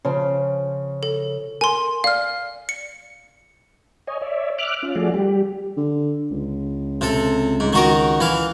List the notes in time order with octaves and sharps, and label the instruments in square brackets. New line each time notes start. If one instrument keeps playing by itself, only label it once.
[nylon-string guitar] C#3 F3 C5
[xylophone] A4
[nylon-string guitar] A#4 [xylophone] G#5 C6
[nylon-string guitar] D5 [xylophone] F5 F6
[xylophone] C#7
[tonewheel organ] C#5 D#5 G#5
C#5 D5 E5
E5 D6 F6 F#6
C#4 F4
F3 A3 F#4 G#4 D5
G3 G4
[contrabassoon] D3
C#2
[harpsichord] C3 A4
G#2
D#3 F#4 A#4
E3 F5